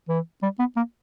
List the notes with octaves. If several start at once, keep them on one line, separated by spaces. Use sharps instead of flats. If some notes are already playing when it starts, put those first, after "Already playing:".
E3
G3
B3
A#3